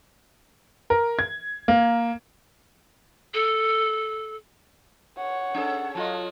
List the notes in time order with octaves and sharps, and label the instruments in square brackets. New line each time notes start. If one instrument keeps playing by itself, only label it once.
[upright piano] A#4
G#6
A#3
[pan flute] A4
[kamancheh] C#5 F#5
[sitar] C#4 G#4 A4
[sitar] F#3 F4 D#5 [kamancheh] A5